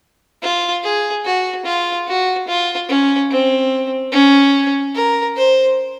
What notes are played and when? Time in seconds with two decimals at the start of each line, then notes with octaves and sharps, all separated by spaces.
0.43 F4
0.84 G#4
1.25 F#4
1.66 F4
2.08 F#4
2.48 F4
2.89 C#4
3.31 C4
4.12 C#4
4.95 A#4
5.37 C5